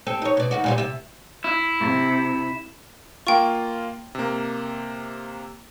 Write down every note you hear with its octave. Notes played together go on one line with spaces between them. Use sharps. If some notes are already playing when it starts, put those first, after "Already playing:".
C4 G4 A4
D#4 C#5
B2 D5
D#2 D#4 F#4
A#2 G3 C4
C3 E5
E4
C3
A#3 F4 G5 C#6
C3 A#3